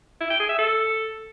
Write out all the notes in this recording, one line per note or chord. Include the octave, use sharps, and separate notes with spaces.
E4
G5
G#4
E5
A4